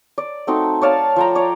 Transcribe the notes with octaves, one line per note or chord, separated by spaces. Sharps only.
D5
A3 C4 D#4 F#4
C#5 D5 F5 A5
F3 G5 A#5
C#5 D5